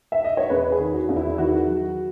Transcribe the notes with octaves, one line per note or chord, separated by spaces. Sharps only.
E5
D#5
C#5
E2 B4
G#4
D#3
F#4
E2
E4
D#3 F#4
F#3